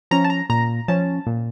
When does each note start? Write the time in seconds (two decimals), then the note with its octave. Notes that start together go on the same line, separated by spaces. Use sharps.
0.11 F3 C#4 A#5
0.24 A5
0.30 A#5
0.50 A#2 A#5
0.88 F3 C#4 A5
1.27 A#2